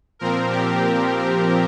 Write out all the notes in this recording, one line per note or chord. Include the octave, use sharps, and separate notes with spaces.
A#2 F3 C4 A#4
G4
G4